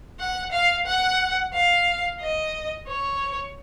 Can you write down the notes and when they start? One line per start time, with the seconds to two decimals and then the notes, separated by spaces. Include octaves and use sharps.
0.19 F#5
0.52 F5
0.86 F#5
1.53 F5
2.20 D#5
2.88 C#5